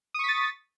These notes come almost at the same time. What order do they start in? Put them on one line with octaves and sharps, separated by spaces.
D#6 C#6 B6 A6